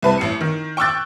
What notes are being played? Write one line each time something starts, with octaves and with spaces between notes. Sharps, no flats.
C2 B4 A5
A1 C7 C#7
D#3
G5 C#6 D6 E6 F#6 A6